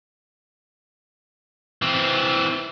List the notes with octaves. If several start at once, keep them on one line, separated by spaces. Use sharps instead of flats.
E3 C4